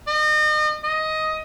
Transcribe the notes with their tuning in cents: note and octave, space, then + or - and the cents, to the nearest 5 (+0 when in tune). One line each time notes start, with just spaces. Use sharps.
D#5 -35
D#5 +10